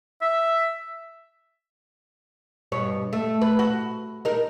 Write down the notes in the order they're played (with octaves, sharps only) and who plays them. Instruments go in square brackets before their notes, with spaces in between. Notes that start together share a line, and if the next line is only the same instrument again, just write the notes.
[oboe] E5
[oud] G2 B2 C#5
A3
B4
F#4
D#4 A#4